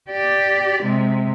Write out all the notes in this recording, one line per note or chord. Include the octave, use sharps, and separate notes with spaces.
G4 D5
C3 G#3